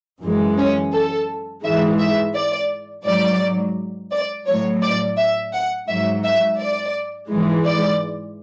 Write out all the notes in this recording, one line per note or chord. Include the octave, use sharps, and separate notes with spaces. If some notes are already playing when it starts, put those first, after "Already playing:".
F#2 E3 G#3
C#4
A4
G#2 E3 G#3 E5
E5
D5
G#2 F#3 D5
D5
A2 F#3 C#5
D5
E5
F#5
G#2 F#3 E5
E5
D5
G#2 E3 G#3
D5